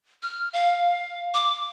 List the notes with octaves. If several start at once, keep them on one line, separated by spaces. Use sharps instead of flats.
F6
F5
D6